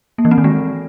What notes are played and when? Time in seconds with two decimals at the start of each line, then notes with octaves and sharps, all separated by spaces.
0.18 A#3
0.25 E3
0.31 C4
0.38 D#3
0.44 G#3